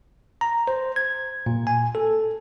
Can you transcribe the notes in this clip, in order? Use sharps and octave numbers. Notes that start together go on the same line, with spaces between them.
A#5
C5
G#6
A#2
G#5
A4